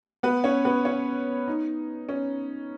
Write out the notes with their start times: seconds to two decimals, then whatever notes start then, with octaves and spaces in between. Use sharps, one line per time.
0.23 B3 B4
0.44 C#4 C#5
0.65 B3 B4
0.85 C#4 C#5
1.48 D#4
2.09 C#4